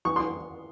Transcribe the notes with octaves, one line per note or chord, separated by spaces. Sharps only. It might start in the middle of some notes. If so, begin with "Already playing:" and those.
E3 C#6
C6
E3